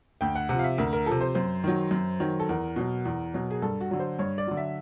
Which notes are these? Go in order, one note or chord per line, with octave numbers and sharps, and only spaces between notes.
D2 G5
F#5
C3 F3 F#5
F5
E5
D2 A#4
A#4
F3 A4
C3
C5
F#2 C5
D#3 F#3
F#2
D#3 F#3
A4
E2 A#4
B2 F#3
E2
B2 F#3
G#4
G2 A4
F#4
D3 F#3
C5
G2 C#5
D5
D3 F#3
E5